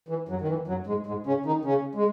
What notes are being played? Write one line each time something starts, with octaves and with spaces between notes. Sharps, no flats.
E3
F#2 F#3
D#3
E3
F#2 F#3
G#2 G#3
G#2 G#3
C#3 C#4
D#3 D#4
C#3 C#4
G#3